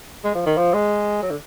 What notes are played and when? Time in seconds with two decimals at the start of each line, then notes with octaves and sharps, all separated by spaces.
0.24 G#3
0.35 F3
0.46 D#3
0.57 F3
0.73 G#3
1.22 F#3
1.30 D3